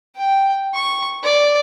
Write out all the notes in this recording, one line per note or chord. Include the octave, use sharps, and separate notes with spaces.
G5
C#6
D5